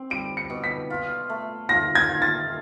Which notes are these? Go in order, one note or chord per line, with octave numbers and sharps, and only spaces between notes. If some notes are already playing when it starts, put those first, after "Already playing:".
Already playing: C4
G3 D7
C#7
B2
B6
F4
A3
F4 A#6
G#6
F4
A6